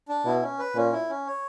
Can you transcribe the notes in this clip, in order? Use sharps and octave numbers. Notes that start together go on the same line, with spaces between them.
D4
B2 E4
C#4
B4
A#2 C#4
E4
C#4
C#5